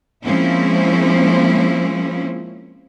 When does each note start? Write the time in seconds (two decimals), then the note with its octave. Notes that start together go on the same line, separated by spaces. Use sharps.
0.24 F3 G#3 A#3 C4 C#4 E4